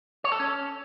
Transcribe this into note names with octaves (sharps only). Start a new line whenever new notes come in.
C#5
A4
C#4